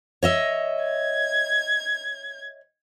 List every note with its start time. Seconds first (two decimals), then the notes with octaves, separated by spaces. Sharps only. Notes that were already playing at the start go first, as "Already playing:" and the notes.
0.23 C#5 D#5 E5
0.84 G#6